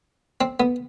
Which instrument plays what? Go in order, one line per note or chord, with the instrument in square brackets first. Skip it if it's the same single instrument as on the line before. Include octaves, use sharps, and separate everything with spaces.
[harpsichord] C4
B3